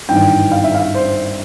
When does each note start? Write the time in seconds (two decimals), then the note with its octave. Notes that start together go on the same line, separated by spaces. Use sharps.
0.08 G#1 G2 E3 G5
0.52 F5
0.64 E5
0.74 F5
0.95 C5